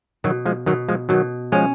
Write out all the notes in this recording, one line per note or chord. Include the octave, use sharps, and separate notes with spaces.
B2 D#3 F#3
F3 G#3
B2 D#3 F#3
F3 G#3
B2 D#3 F#3
F3 G#3 C#4